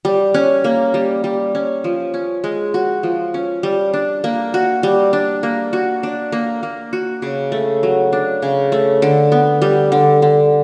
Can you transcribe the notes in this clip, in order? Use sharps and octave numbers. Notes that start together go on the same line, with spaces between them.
G3
C#4
A#3
G3
G3
C#4
F3
C#4
G#3
F#4
F3
C#4
G3
D4
A#3
F#4
G3
D4
A#3
F#4
D4
A#3
A#3
F#4
C#3
A3
F#3
D4
C#3
A3
D3
B3
G3
D3
D3